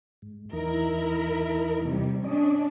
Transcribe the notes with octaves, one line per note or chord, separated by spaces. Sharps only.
G#2
E2 E3 D#4 E4 A#4
C3 G3
C#4 D4 D5 D#5